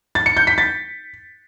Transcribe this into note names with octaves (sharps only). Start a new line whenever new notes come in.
A6
C#7
G6
B6
A6